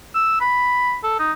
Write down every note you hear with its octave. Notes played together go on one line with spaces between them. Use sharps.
E6
B5
A4
D#4